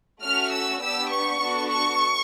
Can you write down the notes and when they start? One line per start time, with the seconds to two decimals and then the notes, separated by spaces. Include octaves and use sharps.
0.23 A3 C#4 F#4 F6
0.53 E6
0.82 B3 D4 G4 E6
1.12 C#6
1.41 B3 D4 F#4 A4
1.71 C#6